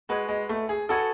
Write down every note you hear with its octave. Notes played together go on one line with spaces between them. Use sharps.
G#3 F#4 B4 D#5 G#5
G#3
A3
G#4
F#4 A4 B4 D#5 G#5